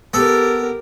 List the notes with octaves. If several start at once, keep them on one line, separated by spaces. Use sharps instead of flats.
B3 G4 A4 A#4